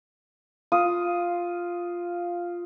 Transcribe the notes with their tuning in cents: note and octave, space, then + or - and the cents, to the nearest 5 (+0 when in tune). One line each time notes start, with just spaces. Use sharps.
F4 +0 D#6 +5